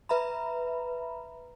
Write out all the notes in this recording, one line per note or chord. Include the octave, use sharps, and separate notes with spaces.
B4 E5 A#5 B5